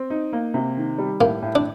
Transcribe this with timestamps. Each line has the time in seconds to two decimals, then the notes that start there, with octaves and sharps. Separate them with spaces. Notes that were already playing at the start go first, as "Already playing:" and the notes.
Already playing: C4
0.10 D#4
0.33 A#3
0.54 C3
0.77 D#3
0.98 G3
1.21 A2 A#3
1.42 A2
1.55 D4